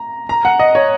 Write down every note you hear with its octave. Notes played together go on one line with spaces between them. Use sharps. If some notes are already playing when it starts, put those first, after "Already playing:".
Already playing: A#5
A#5
F#5
D#5
C#5